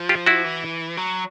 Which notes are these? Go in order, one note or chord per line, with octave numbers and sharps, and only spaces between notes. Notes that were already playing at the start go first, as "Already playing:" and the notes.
Already playing: F3
F4 G4
E4 F#4
E3
F#3